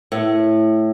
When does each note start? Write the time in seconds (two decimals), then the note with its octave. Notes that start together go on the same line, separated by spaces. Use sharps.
0.12 A2